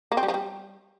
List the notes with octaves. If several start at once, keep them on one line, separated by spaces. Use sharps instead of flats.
A#3
C4
G3
F3
G3